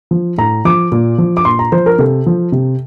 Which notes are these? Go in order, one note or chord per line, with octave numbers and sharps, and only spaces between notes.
F3
A2 A#5
F3 D6
A#2
F3
D6
A#2 C6
A#5
F3 C5
A#4
C3 A4
F3
C3